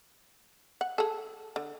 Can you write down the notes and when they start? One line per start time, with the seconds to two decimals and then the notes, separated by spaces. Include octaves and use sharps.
0.81 F#5
0.98 G#4 A4
1.56 D3